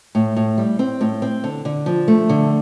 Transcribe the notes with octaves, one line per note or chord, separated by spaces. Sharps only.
A2
A2
G3
C4
A2
C4
D3
D3
F3
A3
D3